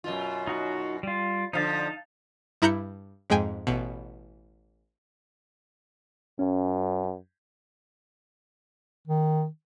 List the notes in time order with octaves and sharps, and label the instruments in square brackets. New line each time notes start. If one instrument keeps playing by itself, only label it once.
[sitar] F#2 B2 F4
[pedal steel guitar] D#4 F#4
G3 F4
[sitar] D3 F3 [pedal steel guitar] D#4 F5 A5
[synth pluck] G2 E4 A#5 F#6 G6 C#7
F2 G#2 G#3 G5 G#5
A1 B2
[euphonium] F#2 [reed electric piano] C#4
[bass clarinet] D#3